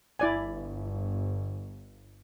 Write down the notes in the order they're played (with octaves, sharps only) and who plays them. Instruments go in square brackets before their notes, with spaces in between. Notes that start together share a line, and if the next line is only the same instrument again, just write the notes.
[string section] G1 [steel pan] E4 D5 G#5